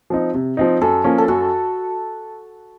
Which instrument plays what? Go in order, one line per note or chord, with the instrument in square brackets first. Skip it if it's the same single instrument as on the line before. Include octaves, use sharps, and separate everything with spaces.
[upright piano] F3 C4 D#4
C3
F3 C4 D#4
[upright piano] F#2 [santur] A4
[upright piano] F3 A#3 C#4
[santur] A4
[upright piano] F#2 [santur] F#4